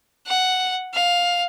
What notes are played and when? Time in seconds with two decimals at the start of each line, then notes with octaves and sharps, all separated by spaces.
0.27 F#5
0.94 F5